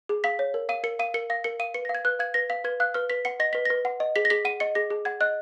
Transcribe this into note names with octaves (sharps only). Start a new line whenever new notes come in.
G#4
F5 B6
C#5
A#4
F5 D#7
A#4 C#7
F5 D#7
A#4 C#7
F5 A#6
A#4 C#7
F5 D#7
B4 C#7
A#6
F5
G#6
B4 F#6
F5 G#6
B4 A#6
F5 B6
B4 G#6
F5 F#6
B4 F6
B4 B6
F#5 C#7
D#5 A#6
B4 B6
B4 A#6
F#5
D#5
G#4 B6
A#6
G#4 B6
F#5 D#7
D#5 C#7
G#4 A#6
G#4
F#5 G#6
D#5 F#6